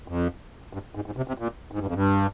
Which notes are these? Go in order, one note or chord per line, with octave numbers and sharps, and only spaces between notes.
F2
G2
G#2
G#2
C3
C3
A#2
G#2
G2
F2
G2